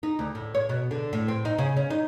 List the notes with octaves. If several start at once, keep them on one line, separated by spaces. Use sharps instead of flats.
D#4
D2
A2
C#5
B2
D3
A2
C4
D#4
C#3
C#4
D#4